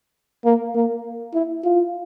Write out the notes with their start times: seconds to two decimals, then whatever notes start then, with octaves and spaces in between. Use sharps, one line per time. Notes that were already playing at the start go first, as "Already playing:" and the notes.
0.45 A#3
0.75 A#3
1.34 E4
1.64 F4